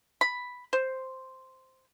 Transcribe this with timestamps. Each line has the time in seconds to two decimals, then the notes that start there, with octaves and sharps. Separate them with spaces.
0.21 B5
0.73 C5